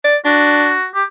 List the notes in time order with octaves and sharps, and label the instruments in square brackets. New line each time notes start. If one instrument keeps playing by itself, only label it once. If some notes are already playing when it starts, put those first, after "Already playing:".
[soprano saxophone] D5
[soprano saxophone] D4 [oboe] F#4
[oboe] G4